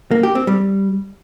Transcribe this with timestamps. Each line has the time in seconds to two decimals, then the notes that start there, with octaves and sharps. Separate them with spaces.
0.11 A#3
0.23 G4
0.35 C4
0.47 G3